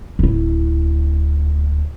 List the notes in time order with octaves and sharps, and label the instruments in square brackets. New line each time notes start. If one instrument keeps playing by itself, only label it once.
[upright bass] D1 E4